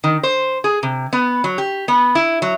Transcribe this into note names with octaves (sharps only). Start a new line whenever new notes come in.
D#3
C5
G#4
C3
B3
F#3
G4
B3
E4
F#3